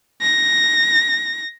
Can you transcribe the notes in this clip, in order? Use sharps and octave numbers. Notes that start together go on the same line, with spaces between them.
A#6